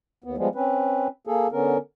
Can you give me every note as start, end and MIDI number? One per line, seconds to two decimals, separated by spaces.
0.24 0.36 39
0.24 0.36 59
0.37 0.48 53
0.37 0.48 55
0.37 0.48 56
0.37 0.48 59
0.55 1.07 60
0.55 1.07 61
0.55 1.07 71
1.27 1.47 58
1.27 1.47 68
1.27 1.47 69
1.52 1.78 50
1.52 1.78 59
1.52 1.78 61
1.52 1.78 70